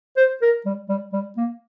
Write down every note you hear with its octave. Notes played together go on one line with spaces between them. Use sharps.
C5
A#4
G3
G3
G3
A#3